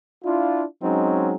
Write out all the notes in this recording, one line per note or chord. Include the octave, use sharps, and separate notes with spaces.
D4 E4 F4
F#3 G#3 C4 C#4 D#4